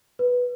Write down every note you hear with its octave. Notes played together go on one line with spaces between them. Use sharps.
B4